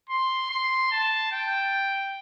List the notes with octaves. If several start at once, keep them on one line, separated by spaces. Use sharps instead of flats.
C6
C6
A5
G5